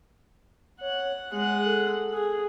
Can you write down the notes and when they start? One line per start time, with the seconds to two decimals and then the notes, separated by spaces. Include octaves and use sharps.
0.81 C#5 F#5
1.32 G#3 G#4 F#5
1.65 A4
2.13 G#4